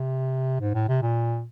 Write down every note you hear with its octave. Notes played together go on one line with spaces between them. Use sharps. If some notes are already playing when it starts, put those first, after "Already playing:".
Already playing: C3
G#2
A2
C3
A#2